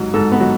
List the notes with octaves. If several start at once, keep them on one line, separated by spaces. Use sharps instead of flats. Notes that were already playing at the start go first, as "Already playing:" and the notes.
Already playing: G#2 F#3
G#2 A4
B3
F#3